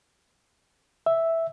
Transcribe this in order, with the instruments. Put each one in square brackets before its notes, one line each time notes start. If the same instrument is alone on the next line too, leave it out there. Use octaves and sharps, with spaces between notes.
[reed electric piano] E5